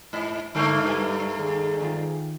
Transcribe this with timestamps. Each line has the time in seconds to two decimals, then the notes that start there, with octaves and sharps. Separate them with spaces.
0.13 G#2
0.55 G2 D3 A3 A#3
0.86 G3 B4 G#5
1.38 D#2 G#4
1.82 D#3 F4